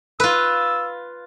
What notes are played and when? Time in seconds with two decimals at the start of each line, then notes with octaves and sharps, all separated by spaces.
0.20 F4 B4 E6